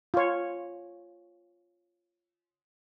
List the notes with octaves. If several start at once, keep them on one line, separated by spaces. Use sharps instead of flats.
F4 C#5